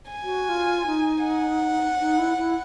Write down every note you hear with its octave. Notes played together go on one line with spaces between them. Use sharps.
G#5
F#4
F4
D#4
F#5
D#4
E4
E4